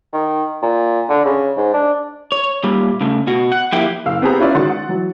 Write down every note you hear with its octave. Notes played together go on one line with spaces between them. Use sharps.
D#3
A#2
D3
C#3
G#2
D4
C#5
A#2 G3
C#3 A3
B2 F#4
F#5
F3 A#3 E4 G4 G5
F#1 F5 E6
B3 C4 G4 G#4 A#5
C#4 E4 F4 B4 C#5 D5
D#3 G#3 F#4 F#5 C6 A6
F#5
E3 F#3